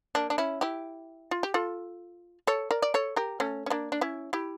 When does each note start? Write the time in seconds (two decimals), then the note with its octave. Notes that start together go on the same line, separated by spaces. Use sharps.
0.15 A#3 D4
0.30 D4
0.38 C#4 E4
0.61 E4 G4
1.31 F4
1.43 G4
1.54 F4 A4
2.47 A4 C#5
2.71 A#4 D5
2.82 D5
2.94 A4 C#5
3.16 G4 A#4
3.40 A3 C#4
3.66 C#4
3.70 A#3 D4
3.92 D4
4.01 C#4 E4
4.33 E4 G4